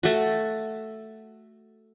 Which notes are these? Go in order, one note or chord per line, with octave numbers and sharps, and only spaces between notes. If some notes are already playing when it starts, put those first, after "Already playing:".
A3 F#4